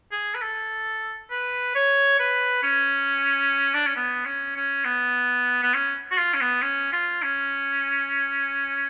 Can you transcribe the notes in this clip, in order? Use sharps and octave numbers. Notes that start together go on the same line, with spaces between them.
G#4
B4
A4
B4
C#5
B4
C#4
D4
C#4
B3
C#4
C#4
B3
B3
C#4
F#4
F4
C#4
B3
C#4
F4
C#4